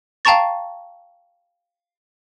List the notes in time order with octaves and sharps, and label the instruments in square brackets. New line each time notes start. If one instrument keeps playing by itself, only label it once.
[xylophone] F5 G5 A5 A#5 C#6 A6